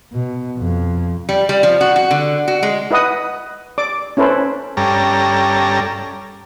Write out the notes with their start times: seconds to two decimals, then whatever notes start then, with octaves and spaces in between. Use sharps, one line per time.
0.12 B2
0.58 F2
1.29 G3
1.49 G3
1.63 F3
1.81 F#4
1.96 F#4
2.11 D3
2.48 F#4
2.63 G#3
2.91 E4 B4 D#5 F#5 D#6
3.78 D5 D6
4.17 C#4 E4 A4 B4 C5
4.77 G2 G3 C#4 A4 A#5